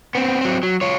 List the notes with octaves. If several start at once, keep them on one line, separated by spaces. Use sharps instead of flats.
B3 C4
F#3 C4
F#3
F4 C#5